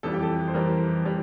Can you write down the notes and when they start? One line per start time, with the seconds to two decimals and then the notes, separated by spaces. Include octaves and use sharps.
0.03 F2 E3 G3 A4
0.14 G4
0.23 A4
0.48 C5
0.54 F2 E3 G3 A#4
1.05 E3 G3